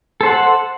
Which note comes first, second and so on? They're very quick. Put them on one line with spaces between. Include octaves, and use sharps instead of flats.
A4 C5 F#5